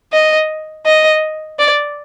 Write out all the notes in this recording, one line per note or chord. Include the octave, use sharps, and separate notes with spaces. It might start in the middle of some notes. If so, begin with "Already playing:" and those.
D#5
D#5
D5